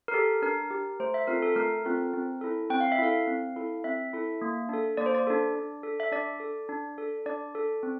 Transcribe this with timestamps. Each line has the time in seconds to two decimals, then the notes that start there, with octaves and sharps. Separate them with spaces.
0.08 A#4
0.14 G4 A4
0.42 D4 A#4
0.70 G4
1.00 A3 C5
1.14 E5
1.27 C4 F4 A4 A#4
1.42 A4
1.56 A3 A#4
1.85 C4 F4 A4
2.14 C4
2.41 E4 A4
2.70 C4 G5
2.80 F5
2.92 E5
2.99 E4 A4 F5
3.27 C4
3.56 E4 A4
3.84 C4 E5
4.13 E4 A4
4.41 A#3
4.69 D4 A4
4.97 A#3 D5
5.06 C5
5.14 D5
5.27 D4 A4
5.56 D4
5.83 A4
6.00 E5
6.12 D4 D5
6.40 A4
6.69 D4
6.98 A4
7.26 D4 D5
7.55 A4
7.83 C4